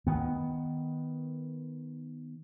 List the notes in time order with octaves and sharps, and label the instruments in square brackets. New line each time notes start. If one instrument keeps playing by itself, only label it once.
[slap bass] D#3 B3